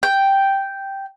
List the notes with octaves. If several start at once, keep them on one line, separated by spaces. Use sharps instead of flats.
G5